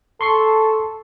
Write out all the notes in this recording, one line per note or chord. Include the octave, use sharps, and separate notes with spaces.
A4 C6 C#6 C7